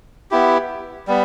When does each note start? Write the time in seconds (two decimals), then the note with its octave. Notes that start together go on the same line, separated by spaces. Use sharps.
0.31 B3 E4 G4
1.07 G3 B3